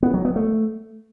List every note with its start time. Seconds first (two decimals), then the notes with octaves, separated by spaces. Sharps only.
0.03 B3
0.14 F#3
0.25 B3
0.36 A3